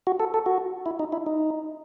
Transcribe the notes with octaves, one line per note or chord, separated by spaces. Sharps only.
F#4
A4
A4
F#4
E4
D#4
E4
D#4